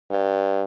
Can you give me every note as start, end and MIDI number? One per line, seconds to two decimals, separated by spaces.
0.10 0.65 43